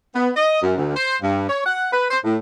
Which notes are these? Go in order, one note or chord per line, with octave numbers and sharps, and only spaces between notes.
B3
D#5
F#2
D2
C5
G2
C#5
F#5
B4
C5
A2